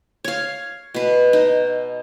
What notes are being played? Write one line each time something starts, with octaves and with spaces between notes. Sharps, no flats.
C#5 F5
B2 B4
D#4